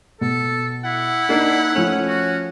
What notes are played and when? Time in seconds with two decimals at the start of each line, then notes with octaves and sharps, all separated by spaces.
0.21 B2 A4
0.85 E4 F#5
1.29 A#3 D4 D#4 C7
1.75 F3 A3 C#4
2.07 F#4